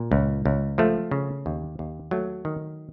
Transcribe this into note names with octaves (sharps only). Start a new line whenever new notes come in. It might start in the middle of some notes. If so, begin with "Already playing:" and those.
Already playing: A#2
C#2
C#2
F3 A3
C#3
D#2
D#2
F#3 A3
D#3